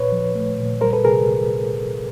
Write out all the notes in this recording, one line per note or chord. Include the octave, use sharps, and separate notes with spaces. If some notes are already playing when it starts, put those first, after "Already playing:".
Already playing: A#2 B4 C#5
F3
A3
A#2
G3 A#4 C5
A4 B4
C3 G#4 A#4